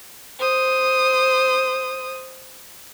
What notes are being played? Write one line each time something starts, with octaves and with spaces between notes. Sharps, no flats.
C5 D#6